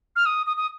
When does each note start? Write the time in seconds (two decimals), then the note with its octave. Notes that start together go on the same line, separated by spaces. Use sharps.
0.16 F6
0.26 D#6
0.47 D#6
0.57 D#6